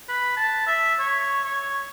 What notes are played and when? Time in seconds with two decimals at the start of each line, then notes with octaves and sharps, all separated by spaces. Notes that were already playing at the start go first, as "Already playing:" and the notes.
0.09 B4
0.37 A5
0.67 E5
0.99 C#5
1.44 C#5